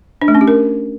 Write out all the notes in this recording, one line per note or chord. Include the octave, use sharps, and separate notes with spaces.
D4
A3
C#4
G4
A#4